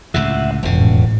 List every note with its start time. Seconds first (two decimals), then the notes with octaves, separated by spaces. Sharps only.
0.14 C#2 A2 C3 E5 F#5
0.63 E1 A1 F2 G#2 C#3